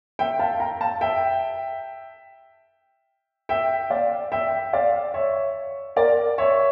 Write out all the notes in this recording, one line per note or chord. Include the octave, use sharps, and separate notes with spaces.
E5 G5
F5 A5
G5 A#5
F5 A5
E5 G5
E5 G5
D5 F5
E5 G5
D5 F5
C#5 E5
A#4 D5
C#5 E5